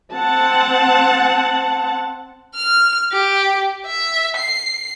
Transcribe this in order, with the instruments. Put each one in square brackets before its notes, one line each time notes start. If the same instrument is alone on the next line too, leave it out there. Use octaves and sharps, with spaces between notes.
[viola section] C4 F#5 A5
[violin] F6
G4
E5
C7